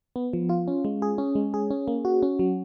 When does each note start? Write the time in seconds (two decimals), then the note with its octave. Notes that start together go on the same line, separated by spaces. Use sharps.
0.16 B3
0.33 F3
0.49 F4
0.68 C#4
0.85 G#3
1.02 G#4
1.18 C#4
1.35 G#3
1.54 G#4
1.70 C#4
1.88 A#3
2.05 F#4
2.23 C#4
2.39 F#3